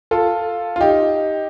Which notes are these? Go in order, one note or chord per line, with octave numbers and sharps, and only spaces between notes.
F4 A4
F4
D#4 G4